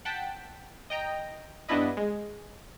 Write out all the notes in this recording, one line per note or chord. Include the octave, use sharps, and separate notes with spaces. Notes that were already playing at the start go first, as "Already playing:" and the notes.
F#5 G5 A5 B6
D#5 G5 A#5
G2 B3 D4 E4 B4 D#5
G#3